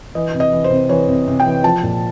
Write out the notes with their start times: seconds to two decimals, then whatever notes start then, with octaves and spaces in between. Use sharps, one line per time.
0.15 E3 D#5
0.34 C3
0.40 D#5
0.52 E3
0.64 C5
0.70 C3
0.89 E3 C#5
1.08 C3
1.27 C3
1.40 G5
1.46 E3
1.64 F3 A5
1.83 A#2